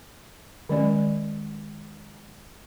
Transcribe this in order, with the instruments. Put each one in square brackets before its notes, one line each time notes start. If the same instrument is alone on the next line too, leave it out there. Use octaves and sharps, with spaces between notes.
[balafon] D#3 F#3 G#3 C#4 D5